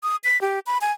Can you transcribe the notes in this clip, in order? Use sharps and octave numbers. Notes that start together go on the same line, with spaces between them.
D#6
B6
G4
B5
G#5